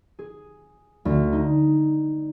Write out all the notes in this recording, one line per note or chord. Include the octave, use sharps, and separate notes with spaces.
G#4
D2
D#4